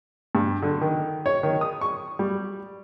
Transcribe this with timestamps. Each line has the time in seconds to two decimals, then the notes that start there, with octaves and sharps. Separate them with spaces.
0.35 G2
0.62 D3
0.81 D#3
1.26 C#5
1.43 D#3
1.61 D#6
1.81 C#6
2.19 G3